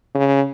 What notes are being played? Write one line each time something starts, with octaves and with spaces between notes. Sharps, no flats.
C#3